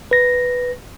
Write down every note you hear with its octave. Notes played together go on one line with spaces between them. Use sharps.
B4 A#6